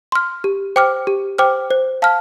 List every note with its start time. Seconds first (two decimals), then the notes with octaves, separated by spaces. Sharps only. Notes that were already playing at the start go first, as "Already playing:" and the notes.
0.12 C6 F6
0.44 G4
0.76 C5 G5 D6 F6
1.07 G4
1.38 C5 G5 D6 F6
1.71 C5
2.02 F5 A5 F6